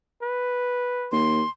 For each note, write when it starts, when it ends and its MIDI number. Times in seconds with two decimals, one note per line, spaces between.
0.22 1.14 71
1.12 1.42 39
1.12 1.50 84